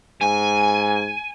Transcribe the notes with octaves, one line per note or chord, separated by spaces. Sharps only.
G#2 G#5